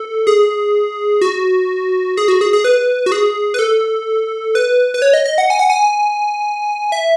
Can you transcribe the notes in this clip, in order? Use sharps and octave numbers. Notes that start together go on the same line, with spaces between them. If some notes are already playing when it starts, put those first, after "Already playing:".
Already playing: A4
G#4
F#4
G#4
F#4
G#4
G#4
B4
F#4
G#4
B4
A4
B4
B4
C#5
D#5
D#5
F#5
G#5
F#5
G#5
E5